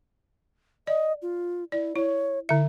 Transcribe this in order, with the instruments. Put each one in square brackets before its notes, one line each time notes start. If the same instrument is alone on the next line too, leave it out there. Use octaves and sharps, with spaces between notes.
[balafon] D5 [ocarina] D#5
[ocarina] F4
[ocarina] E4 [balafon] D5
[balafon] E4 [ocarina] C#5
[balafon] D3 E5 [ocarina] E4